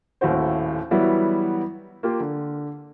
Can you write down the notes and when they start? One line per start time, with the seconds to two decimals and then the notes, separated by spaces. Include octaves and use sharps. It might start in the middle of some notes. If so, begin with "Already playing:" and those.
0.21 D#1 D#2 A2 E4 F#4 C5
0.91 E3 F#3 G3 B3 E4 F#4
2.03 A#3 F4 G4
2.20 D3